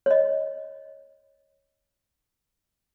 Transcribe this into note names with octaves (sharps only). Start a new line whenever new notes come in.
C#5 D#5